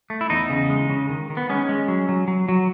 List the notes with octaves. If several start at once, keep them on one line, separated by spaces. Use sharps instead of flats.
A3
E4
E2 D#4
C#3
G#3
C#3
D#3
D#3
B3
G#3 C#4
G#3
F#3
F#3
F#3
F#3